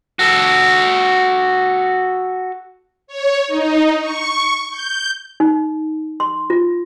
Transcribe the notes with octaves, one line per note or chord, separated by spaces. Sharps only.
F#4 A4
C#5
D#4
C#6
G6
D#4
C6
F4